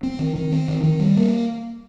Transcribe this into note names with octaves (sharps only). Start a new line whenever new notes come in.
C4
D#3
D#3
C4
D#3
D#3
G3
A#3